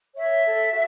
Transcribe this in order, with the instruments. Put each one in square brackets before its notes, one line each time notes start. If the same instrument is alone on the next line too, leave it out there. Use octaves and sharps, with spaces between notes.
[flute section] C#5 E5
A4
F#4